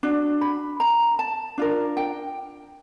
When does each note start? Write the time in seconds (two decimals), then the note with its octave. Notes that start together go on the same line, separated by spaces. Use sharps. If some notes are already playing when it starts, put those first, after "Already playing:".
0.03 D4 F#4
0.41 B5
0.80 A#5
1.19 A5
1.58 D4 F4 A#4
1.97 G5